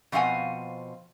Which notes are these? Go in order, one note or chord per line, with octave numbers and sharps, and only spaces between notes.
B2 F3 C4 F5 F#5 G#5